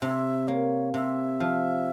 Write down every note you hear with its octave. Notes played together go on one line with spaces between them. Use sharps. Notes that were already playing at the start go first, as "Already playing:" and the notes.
C3 E5
A#3 C#5
C3 E5
F3